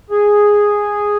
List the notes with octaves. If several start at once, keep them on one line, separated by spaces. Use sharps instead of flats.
G#4